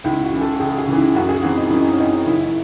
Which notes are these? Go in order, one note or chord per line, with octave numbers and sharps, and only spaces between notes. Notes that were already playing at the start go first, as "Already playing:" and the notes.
C#2 E4
F#4
C#3 E3
A4
C#2 G#4
G#4
C#3 E3
E4
F#2 F#4
G#4
E3 C4 F#4
D#4
F#2 E4
D#4
C#4
E3 C4 D#4
F#1 E4